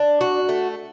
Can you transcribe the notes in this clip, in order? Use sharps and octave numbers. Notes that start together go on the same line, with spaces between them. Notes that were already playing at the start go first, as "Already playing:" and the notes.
Already playing: D4
F#4
A3